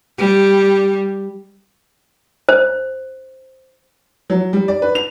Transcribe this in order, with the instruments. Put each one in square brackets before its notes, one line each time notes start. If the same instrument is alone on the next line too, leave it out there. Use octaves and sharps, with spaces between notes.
[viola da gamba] G3
[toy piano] C5
[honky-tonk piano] F#3
G3
D5
B4
F7